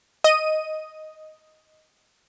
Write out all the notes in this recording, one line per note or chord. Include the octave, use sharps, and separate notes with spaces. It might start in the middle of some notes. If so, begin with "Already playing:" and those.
D#5 D#7